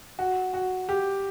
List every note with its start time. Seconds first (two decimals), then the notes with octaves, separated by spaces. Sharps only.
0.19 F#4
0.54 F#4
0.89 G4